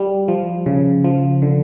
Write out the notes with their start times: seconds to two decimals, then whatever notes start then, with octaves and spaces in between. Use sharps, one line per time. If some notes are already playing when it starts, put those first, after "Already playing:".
Already playing: G3
0.28 F3
0.66 C#3
1.04 F3
1.42 D3